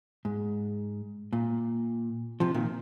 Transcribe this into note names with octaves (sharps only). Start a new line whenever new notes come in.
G#2
A#2
C3 F3
A#2 D#3